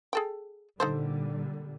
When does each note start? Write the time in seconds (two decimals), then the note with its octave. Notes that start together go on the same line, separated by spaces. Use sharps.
0.13 G#4 A4 G5
0.80 A#2 D3 G3 D#4 A4 C5